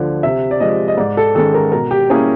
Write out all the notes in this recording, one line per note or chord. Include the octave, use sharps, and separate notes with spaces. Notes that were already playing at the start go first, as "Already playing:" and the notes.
Already playing: D2 D3 F3
C3 E5
D5
F3 G#3 D#5
D#5
G#2 D5
A4
D#3 G#3 C#4 A4
A#4
B2 A#4
G4
G3 A#3 C#4 E4 G#4